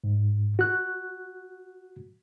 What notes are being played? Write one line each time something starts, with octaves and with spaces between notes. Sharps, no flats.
G#2
F#4 F#6